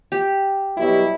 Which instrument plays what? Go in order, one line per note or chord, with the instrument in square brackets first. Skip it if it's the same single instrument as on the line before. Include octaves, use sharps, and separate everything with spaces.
[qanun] G4
[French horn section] B2 F#3 G3 [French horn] E4